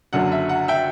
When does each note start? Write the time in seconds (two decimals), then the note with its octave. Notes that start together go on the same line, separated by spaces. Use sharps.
0.13 F#1 F#2 D3 F#3 F#5
0.32 E5
0.49 F#5
0.68 E5 G5